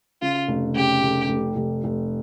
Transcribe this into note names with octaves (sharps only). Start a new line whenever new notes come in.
C#3 F4
F1
C#3 G4
F1
F1
F1
F1